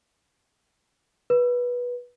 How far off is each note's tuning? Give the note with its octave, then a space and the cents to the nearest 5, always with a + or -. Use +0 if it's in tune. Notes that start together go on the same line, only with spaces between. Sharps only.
B4 -15